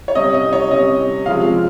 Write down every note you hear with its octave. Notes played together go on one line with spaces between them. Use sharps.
C#5
C3 G3 C#4 D#5
D#5
C#5
C3 G3 C#4 D#5
C3 F3 G#3 F5